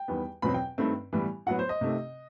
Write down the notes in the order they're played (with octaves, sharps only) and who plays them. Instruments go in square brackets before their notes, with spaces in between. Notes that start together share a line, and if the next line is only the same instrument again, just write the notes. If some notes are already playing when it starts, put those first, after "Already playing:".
Already playing: [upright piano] G5
E2 D#3 G3 B3
E2 B2 F#3 C4 B5
G5
G2 D#3 A3 C4
A2 E3 G3 B3
A2 F#3 B3 F#5
C5
D#5
C3 D#3 A3 C4